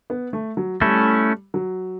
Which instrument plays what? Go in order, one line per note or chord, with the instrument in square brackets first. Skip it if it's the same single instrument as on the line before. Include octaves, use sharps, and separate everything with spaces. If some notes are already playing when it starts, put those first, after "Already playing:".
[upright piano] B3
A3
F#3
[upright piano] G3 [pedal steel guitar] A3 C#4 E4
[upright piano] F#3